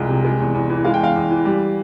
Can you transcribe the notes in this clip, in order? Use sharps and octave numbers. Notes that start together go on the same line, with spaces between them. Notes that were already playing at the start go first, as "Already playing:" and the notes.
Already playing: C2 F3 G#3
C3
G#3
E2
E2
E3
G#3 F5
G5
E2 F5
E2
E3
G3